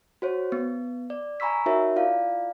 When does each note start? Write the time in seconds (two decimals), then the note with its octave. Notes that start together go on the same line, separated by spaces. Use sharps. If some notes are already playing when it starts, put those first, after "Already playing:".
0.22 F#4 C5 C#5
0.52 B3
1.10 D5
1.40 G#5 A#5 B5 C#6 E6 B6
1.66 D#4 F#4 A#4 C#5 E5
1.96 E4 F4 D5 F5